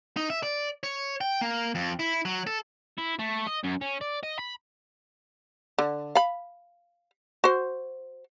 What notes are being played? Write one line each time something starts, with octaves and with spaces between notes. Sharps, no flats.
D#4
E5
D5
C#5
G5
A#3
F2
E4
F#3
A4
E4
A3
D#5
F#2
C#4
D5
D#5
B5
D3
F5 B5
F#4 C5